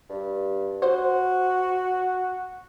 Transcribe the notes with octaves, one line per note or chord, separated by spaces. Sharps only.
G2
F#4 C5